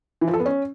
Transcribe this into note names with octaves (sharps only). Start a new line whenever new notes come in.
E3
F3
A4
B3
C#4